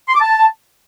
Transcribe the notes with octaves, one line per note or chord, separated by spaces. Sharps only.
C6
D6
A5